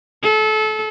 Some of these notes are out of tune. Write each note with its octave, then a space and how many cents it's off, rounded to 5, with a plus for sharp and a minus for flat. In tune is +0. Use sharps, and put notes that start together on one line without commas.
A4 -30